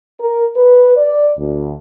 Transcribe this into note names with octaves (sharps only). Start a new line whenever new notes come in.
A#4
B4
D5
D2